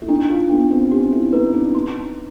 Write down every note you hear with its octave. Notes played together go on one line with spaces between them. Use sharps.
E4
D4 D#4
F4
B3 D4
C4
C#4 G4
E4
D#4 B4
D4
D#4 C6